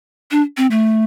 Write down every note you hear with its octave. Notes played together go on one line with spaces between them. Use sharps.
D4
C4
A3